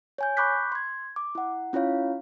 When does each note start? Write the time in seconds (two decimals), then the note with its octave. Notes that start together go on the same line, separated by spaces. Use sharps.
0.18 C#5 G#5 G6
0.37 B5 C#6 D6 F#6 G6 B6
0.72 C6 G#6
1.16 D6
1.35 E4 F#5
1.73 C#4 E4 F4 C#5 F5